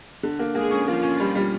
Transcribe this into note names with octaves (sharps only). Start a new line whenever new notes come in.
D3
A#3
G#3 A#3 G#4
C#4
F3 A#3 F4
C#4
G3
G3